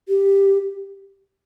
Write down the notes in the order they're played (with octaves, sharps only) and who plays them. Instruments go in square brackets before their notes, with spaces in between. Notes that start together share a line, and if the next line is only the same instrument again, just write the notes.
[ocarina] G4